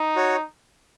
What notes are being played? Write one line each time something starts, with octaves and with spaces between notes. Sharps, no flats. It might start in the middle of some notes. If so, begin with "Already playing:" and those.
Already playing: D#4
F#4 C#5